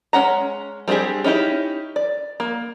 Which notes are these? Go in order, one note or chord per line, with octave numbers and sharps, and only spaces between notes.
G#3 C#4 F#5 A#5
G3 C4 D4 G4 G#4
C#4 D#4 E4 G4
D5
A#3